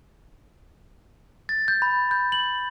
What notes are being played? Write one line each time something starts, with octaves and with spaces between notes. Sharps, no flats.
A6
G6
B5
G6
F#7